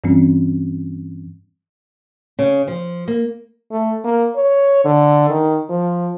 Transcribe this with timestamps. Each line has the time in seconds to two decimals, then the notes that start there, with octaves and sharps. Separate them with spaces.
0.04 G2 E3 G3 C4 C#4
2.39 C#3
2.68 F3
3.08 A#3
3.71 A3
4.04 A#3
4.36 C#5
4.85 D3
5.29 D#3
5.69 F3